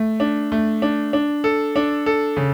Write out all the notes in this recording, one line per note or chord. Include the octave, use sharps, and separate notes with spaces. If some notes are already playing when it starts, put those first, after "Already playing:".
Already playing: A3
D4
A3
D4
D4
A4
D4
A4
C#3